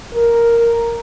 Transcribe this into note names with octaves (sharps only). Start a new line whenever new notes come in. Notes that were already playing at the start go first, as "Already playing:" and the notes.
A#4